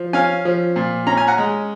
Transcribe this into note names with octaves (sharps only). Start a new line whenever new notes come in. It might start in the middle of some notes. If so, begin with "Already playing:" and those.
Already playing: F3
C#4 F5 G#5
F3
A#2
C#4 A#5
G#5
F#5 A#5
G#3